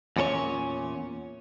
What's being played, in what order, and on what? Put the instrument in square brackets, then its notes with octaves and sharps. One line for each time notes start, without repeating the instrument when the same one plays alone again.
[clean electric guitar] E2 A#2 C#4 A4 C#5